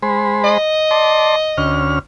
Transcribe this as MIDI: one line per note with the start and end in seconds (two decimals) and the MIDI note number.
0.02 0.58 56
0.02 0.58 72
0.02 0.58 83
0.44 1.86 75
0.91 1.36 74
0.91 1.36 81
0.91 1.36 84
1.57 1.99 38
1.57 1.99 61
1.57 1.99 89